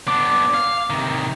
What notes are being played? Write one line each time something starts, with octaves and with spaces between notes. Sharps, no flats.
B3 D4 D6
F5
C3 D#3